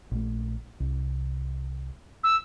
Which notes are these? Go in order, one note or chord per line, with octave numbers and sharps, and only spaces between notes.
A#1 A3
C2
E6